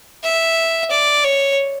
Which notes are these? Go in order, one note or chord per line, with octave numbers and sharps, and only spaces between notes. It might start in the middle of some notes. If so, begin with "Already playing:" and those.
E5
D5
C#5